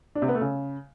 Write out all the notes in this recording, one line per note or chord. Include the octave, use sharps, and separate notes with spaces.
D4
C3
B3
A3
C#3